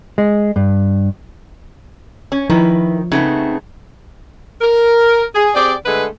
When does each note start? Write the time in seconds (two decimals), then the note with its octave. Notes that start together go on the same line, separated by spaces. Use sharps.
0.18 G#3
0.56 G2
2.32 C#4
2.50 D#3 F3 E4 A#4 B4
3.12 C#3 A3 B3 C4 D#4
4.61 A#4
5.35 G#4
5.55 C4 G4 G#4 D5
5.86 D3 G#3 A3 G#4 A4 B4